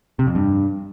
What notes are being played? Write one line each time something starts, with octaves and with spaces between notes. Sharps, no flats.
C3
F2
G2